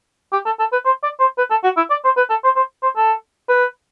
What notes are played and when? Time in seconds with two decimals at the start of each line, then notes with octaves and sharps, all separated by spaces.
0.33 G4
0.45 A4
0.59 A4
0.72 B4
0.85 C5
1.03 D5
1.20 C5
1.38 B4
1.51 A4
1.64 F#4
1.77 E4
1.90 D5
2.04 C5
2.17 B4
2.30 A4
2.44 C5
2.56 C5
2.83 C5
2.96 A4
3.49 B4